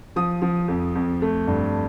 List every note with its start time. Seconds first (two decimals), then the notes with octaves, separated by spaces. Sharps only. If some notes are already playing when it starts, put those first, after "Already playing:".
0.16 F3 D#6
0.42 F3
0.68 F2
0.95 F2
1.22 A3
1.48 G2